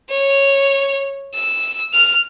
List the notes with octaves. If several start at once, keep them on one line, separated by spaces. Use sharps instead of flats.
C#5
E6
F6